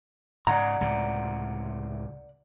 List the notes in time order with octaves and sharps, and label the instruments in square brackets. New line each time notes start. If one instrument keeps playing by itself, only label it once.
[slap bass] G#2 C#3 [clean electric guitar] D5 F#5 A#5
[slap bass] C#2 A2 C3